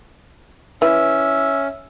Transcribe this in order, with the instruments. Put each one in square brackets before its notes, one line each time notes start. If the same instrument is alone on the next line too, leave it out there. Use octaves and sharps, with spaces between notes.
[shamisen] E3 [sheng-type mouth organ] C#4 [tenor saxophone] E5